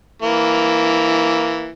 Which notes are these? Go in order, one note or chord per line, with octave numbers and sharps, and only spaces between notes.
E3 A#3